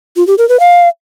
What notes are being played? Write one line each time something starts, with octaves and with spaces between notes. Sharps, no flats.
F4
G4
A#4
B4
F5